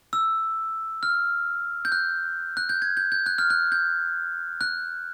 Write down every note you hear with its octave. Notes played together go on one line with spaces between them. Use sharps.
E6
F6
G6
F#6
F#6
G6
G#6
G6
G6
F#6
F6
F#6
G6
F#6